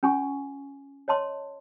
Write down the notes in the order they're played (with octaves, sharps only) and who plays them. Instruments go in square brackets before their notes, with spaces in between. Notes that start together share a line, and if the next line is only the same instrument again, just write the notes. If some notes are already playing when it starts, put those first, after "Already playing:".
[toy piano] C#4 F4 G#5 C#6
C#5 D#5 A5 C6